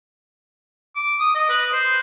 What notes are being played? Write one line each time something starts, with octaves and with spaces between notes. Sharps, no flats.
D6
D#6
D#5
B4
C5